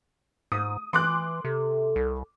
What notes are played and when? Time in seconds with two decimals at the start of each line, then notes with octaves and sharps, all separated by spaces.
0.52 G#2 D#6
0.93 E3 C6 D6 F#6
1.45 C3 A4
1.96 C2